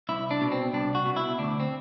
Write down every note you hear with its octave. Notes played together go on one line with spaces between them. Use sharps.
C2 E4
D4
B2
C4
C2 D4
F#4
B2
E4
D2 D4
C4